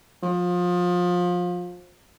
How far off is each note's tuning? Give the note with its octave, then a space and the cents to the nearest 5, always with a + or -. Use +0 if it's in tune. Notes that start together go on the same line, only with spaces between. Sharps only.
F3 +25